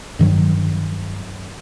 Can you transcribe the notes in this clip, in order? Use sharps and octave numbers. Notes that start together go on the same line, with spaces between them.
G2 D#3 F#3